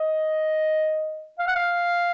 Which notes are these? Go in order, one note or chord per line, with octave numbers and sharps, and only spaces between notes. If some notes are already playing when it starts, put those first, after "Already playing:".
Already playing: D#5
F5
F#5
F5